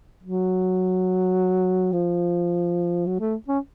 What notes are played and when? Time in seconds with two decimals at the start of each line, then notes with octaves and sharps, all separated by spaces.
0.23 F#3
1.92 F3
3.06 F#3
3.20 A3
3.48 C#4